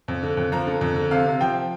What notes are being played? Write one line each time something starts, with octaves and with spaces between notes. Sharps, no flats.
F2
D3
F2
F3 A#5
D3
F2
D3
C3 F5
C3
F3 G5